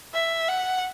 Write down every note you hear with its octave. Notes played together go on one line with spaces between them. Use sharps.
E5
F#5